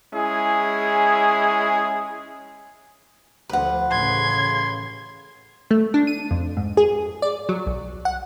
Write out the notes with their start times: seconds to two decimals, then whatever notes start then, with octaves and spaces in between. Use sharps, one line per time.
0.13 G#3 C#4 E4 G#4
3.49 D2 F3 B4 F#5
3.91 A1 C#3 C6 G#6
5.71 A3
5.94 D4
6.07 D#7
6.31 F2
6.57 G#2
6.77 G#4
7.22 D5
7.49 F#3
7.66 B1
8.05 F#5